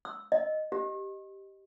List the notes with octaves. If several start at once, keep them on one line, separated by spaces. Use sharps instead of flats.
E6
D#5
G4